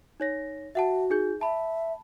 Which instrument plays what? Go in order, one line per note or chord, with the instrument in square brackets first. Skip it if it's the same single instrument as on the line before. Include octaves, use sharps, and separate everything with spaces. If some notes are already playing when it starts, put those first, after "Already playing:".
[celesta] D#4 C#5 A#6
[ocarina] F#4 [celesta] E5 F#5 A5
[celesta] D#4 G#4 G6
[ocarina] E5 [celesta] A5 B5